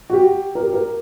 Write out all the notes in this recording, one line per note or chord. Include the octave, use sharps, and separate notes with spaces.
F#4
G4
A#4
G4
A#4